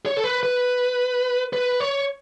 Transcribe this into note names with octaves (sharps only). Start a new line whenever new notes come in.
C#5
A4
B4
B4
B4
C#5